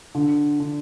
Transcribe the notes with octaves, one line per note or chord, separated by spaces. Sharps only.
D3
D3